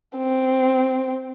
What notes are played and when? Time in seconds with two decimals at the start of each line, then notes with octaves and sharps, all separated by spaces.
0.17 C4